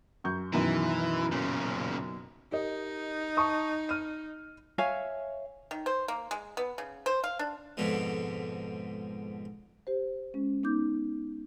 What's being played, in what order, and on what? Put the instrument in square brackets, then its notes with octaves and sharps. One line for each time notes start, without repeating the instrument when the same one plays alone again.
[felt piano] F#2 C#6 G6
[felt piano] F#2 B2 D#3 [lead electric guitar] E3
[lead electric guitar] A#2 C#3
[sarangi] D#4 [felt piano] G4 A#4 D#5
[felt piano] A5 C#6 D#6
F6 D#7
[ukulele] C#5 E5 F5 G#5
[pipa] D#3
C5
A#3
G#3
B3
C#3
C5
F5
D4
[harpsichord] F2 G#2 B2 D3 F3
[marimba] G4 C5
G#3 C#4
B3 D#4 D6 G6